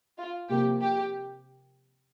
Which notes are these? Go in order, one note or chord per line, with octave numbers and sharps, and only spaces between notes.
F4
C3 F3 A#3 G4
G4